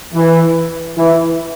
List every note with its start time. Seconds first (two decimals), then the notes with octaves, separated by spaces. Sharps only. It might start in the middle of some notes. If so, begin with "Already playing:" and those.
0.13 E3
0.97 E3